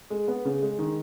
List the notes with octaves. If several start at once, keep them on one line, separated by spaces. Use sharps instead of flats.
G#3
B3
C#3
G#3
D#3